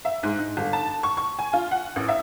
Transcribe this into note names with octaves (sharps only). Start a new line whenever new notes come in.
E5
G#2
D#4
G1
A5
C#6
C#6
G#5
F4
F#5
A1
E5